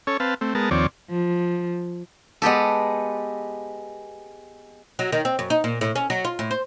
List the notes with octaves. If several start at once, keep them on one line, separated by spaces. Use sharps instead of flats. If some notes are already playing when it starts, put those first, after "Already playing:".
C#4 A4 C#5
C4 B4 F5 A5
A3 C4
G#3 B3 A#4 A5
D#2 F3 C4 C#5 D5
F3
G#3 B3 G4 A4
F#3
D#3
C4
F#2
D#4
A#2
A2
C#4
F#3
F4
A2
C5